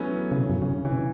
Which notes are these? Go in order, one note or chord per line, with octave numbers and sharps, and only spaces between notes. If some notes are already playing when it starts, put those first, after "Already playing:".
Already playing: E3 F#3 A3 B3 C#4
C#3
B2
F#2
C#3
C#3 E3
B2